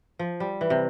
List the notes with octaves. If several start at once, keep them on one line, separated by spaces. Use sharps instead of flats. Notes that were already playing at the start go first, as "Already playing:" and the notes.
F3
G3
E3
C3